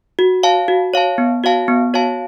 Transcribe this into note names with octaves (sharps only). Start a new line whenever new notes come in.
F#4
C#5 F5 A5
F#4
C#5 F5 A5
B3
F#4 C#5 F5 A5
B3
F#4 C#5 F5 A5